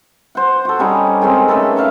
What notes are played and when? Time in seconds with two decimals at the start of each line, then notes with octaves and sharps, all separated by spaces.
0.35 C5 F#5
0.65 F#4 A4
0.79 G3 C#4 D#4 G4
1.21 D#3 G#3 C4 C#4
1.48 A3 C#4 A4 B4
1.76 E5 F5 A5 A#5